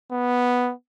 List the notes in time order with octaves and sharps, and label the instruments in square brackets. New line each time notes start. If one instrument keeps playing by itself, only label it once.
[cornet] B3